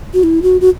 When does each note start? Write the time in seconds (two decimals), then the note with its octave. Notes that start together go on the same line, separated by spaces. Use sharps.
0.14 F#4
0.23 E4
0.43 F#4
0.61 F#4